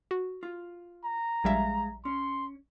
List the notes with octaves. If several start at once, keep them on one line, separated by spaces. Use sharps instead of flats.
F#4
F4
A#5
A#1 G3 G#3 E5 F5
C#4 C6